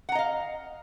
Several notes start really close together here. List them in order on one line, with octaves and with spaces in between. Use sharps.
F#5 A#5 D#5 F5